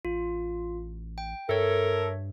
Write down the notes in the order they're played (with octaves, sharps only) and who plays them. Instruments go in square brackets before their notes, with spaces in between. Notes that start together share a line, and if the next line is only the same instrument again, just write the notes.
[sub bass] A1 [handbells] F4
[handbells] G5
[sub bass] G2 [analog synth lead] A4 [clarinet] A#4 [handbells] C#5 E5